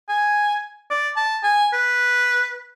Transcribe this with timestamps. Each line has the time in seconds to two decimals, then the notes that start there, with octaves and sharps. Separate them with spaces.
0.09 G#5
0.90 D5
1.16 A5
1.43 G#5
1.73 B4